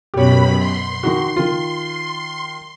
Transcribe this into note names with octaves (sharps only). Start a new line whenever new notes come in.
F#2 B2 G4 C#5 B5
C6
D#3 D#4 F#4
D#3 F4